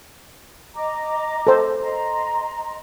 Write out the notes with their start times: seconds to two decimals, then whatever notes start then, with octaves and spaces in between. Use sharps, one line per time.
0.75 D#5 A#5 D6
1.47 A4 C5
1.81 D#5 A#5 C6